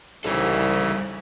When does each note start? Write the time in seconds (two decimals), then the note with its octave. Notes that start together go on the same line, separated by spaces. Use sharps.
0.24 C2 C#3 E3 G3 D#4 A4